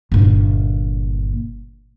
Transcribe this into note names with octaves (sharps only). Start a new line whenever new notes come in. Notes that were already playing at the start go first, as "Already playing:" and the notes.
G1 A#2